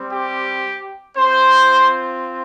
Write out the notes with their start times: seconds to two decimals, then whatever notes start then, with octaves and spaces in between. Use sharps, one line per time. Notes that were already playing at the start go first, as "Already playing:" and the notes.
Already playing: G3 C4
0.11 G4
1.17 C4 F4 C5